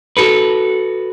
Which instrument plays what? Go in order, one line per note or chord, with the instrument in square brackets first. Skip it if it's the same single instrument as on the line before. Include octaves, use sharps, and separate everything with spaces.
[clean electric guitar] F#4 A4 B4